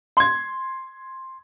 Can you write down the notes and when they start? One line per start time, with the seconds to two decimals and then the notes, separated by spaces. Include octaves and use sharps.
0.17 C6 G#6